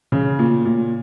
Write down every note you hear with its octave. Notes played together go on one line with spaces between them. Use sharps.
C#3
A#2
A#2